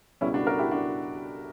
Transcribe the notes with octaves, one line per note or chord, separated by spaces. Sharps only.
C#2 B2 G3 B3 C#4 E4
D4 F#4
F#4 A#4
E4 G4
D4 F#4